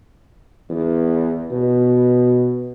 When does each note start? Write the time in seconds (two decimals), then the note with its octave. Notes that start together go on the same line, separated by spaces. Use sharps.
0.69 E2
1.51 B2